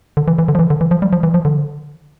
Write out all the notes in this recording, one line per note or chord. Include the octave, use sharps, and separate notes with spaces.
D3
E3
E3
D3
F3
E3
D3
E3
F3
G3
F3
E3
F3
D3